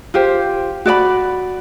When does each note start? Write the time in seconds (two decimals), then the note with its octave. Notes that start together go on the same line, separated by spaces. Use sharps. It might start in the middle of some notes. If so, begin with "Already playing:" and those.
0.14 F4 G4 C5
0.86 F#4 D5 D#5 B5